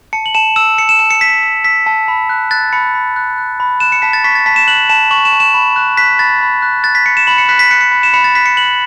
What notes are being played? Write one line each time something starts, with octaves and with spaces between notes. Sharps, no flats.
A5 C#7
F#7
A5 E7
E6 E7
E6 C#7
E7
A5 E7
C#7
A5 B6
E6
E6 B6
A5
B5
F#6
F#6 A6
B5 C#7
B5
F#6
F#6
B5
F#6 E7
C#7
A5 B6
A6
C#6 B6
A6
A5 B6
E7
F#6 F#7
A5 E7
C#6 F#7
E7
A5
E7
B5
F#6
F#6 B6
B5 A6
B5
F#6
F#6 A6
B6
B5 C#7
E7
B5 F#7
C#7
F#6 B6
B6
F#6 C#7
C#7
B5
E7
B5 C#7
A6
F#6 B6
C#7
F#6 F#7